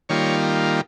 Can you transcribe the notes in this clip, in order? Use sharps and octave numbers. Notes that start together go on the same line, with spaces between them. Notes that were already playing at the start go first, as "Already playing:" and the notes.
D#3 G3 A#3 F4 C#5